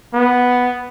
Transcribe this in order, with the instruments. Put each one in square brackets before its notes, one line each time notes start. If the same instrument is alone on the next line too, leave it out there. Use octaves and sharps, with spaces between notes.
[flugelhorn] B3